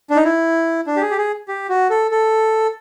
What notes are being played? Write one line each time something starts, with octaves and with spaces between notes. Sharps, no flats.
D4
D#4
E4
D4
G4
G#4
G4
G#4
G4
F#4
A4
A4